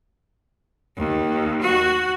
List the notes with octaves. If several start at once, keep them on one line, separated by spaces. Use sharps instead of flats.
D#2
F#4